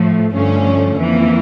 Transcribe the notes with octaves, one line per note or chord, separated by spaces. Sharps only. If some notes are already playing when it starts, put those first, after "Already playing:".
Already playing: A2 F3 A3
G2 D3 F3 A3 C#4
F2 E3 A#3